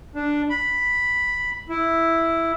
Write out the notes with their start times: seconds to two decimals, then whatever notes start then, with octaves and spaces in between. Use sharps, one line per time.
0.15 D4
0.50 B5
1.69 E4